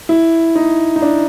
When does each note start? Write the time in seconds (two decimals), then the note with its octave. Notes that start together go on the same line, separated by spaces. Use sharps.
0.09 E4
0.55 D#4
0.96 D#4
1.02 D4